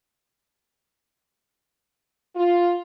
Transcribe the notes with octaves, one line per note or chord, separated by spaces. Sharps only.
F4